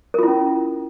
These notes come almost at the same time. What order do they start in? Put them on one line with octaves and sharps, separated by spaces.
A#4 F4 E4 C#4